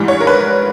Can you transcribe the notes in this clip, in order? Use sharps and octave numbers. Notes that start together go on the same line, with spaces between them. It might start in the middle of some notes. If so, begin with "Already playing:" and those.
Already playing: G#2 E3 G3
C#5
A#4
B4